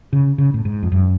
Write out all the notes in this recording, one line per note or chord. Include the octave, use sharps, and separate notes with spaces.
C#3
C#3
A2
G#2
F2
F#2